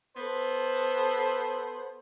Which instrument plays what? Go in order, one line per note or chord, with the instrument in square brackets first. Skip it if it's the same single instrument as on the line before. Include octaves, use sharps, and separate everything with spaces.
[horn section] B3 A4 C5